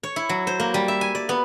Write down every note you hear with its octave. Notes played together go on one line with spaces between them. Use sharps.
C#5
E4
F#3
C5
A#3
G3
E5
G#5
D5
B3